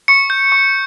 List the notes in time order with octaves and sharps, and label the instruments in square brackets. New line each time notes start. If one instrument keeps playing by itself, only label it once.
[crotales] C#6 C#7
G6
C#6